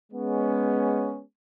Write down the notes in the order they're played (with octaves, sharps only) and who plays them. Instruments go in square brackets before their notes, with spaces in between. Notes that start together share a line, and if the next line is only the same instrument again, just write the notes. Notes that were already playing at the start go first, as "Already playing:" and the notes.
[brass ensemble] G#3 B3 C#4